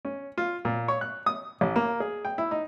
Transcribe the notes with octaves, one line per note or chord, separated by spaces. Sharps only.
C#4
F4
A#2
C#5
F#6
D#6
A1
A#3
G#4
G5
E4
D#4